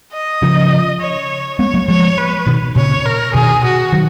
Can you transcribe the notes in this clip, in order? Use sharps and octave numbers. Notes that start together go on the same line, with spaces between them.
D#5
C#3 F3
C#5
G#3 B3 C#5
F#3 A#3
F3 G#3 C#5
B4
B2 D#3
A#2 C#3 C#5
A#4
B2 D#3 G#4
F#4
D#3 F#3